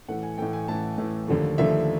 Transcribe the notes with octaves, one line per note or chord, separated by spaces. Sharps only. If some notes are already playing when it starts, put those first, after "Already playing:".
A2 E3 A3 F#5
G#5
A2 E3 A3 G5
G#5
A2 E3 A3 A5
A2 E3 A3
D#2 D3 F3 A3
D#2 D3 F3 A3 E5